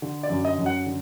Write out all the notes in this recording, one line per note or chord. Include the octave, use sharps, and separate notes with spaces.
D3
D5
F#2
D#5
F#2
F#5
D3